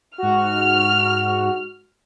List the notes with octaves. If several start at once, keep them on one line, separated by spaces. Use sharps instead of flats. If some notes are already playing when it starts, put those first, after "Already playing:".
G#2 F#4 F6